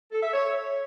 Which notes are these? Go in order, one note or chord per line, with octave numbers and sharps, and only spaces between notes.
A4
E5
C#5